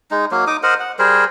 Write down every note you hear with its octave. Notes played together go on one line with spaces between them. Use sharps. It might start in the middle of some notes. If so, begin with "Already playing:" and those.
G#3 D#4
F#3 A#3
D#4 D6 D#6
A#4 C5 D#5 F#5
F#5
G3 G#4 A#4 C5